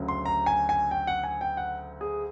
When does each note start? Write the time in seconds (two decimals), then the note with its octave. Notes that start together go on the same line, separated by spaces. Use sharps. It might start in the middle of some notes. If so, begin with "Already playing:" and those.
Already playing: D2 C#3 F#3
0.08 C6
0.25 A#5
0.46 G#5
0.69 G#5
0.91 G5
1.07 F#5
1.24 G#5
1.41 G5
1.57 F#5
2.01 G#4